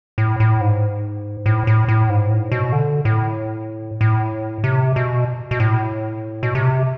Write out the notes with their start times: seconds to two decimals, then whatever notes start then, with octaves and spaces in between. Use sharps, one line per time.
0.18 A2
0.40 A2
0.61 G#2
1.46 A2
1.67 A2
1.88 A2
2.09 G#2
2.30 A2
2.52 B2
2.72 D3
3.05 A2
4.01 A2
4.64 C3
4.96 B2
5.51 B2
5.60 A2
6.43 B2
6.55 C3